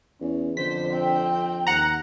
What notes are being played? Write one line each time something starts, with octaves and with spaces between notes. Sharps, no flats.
E2 C#4
F2 D3 C5 B6
C4 G5
D#2 F#5 A#5